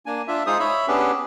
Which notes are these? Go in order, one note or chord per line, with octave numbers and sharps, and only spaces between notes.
A#3 D4 G#5
D4 F4 E5
G#3 D#4 F4 G#4 C5 D#6
C#5 E5 B5
B3 C#4 D4 G4 G#4 B4